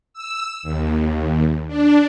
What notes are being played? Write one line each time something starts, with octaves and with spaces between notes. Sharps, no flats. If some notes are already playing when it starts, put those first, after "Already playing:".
E6
D#2
D4